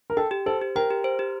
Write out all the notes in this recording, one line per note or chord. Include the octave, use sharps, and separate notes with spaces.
A#4
A4 G5
G4
A4 C5
G4
A#4 G5
G4
C5
G4